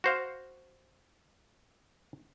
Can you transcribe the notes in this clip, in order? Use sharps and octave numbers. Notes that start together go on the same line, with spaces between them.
F#4 C5 F5